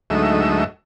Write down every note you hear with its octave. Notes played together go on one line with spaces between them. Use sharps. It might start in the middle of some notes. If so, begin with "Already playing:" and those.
D2 G#2 F#3 A3 D#4 E5